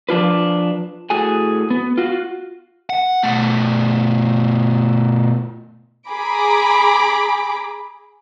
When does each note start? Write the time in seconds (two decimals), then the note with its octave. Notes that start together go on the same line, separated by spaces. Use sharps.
0.09 F3 D4 F4 B4
1.10 A2 F#4 G#4 A4 G#5
1.70 B3
1.98 F4 F#4
2.90 F#5
3.23 B2 A3
6.09 G#4 A#5 B5 D6